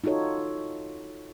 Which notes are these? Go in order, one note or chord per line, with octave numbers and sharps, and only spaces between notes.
D#4 F4 F#4 A4 C#5